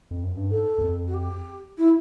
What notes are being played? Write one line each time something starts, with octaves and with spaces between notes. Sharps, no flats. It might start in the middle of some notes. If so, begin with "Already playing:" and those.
F2
F#2
G2
G#2 A4
E2
F2
F#4
G4
E4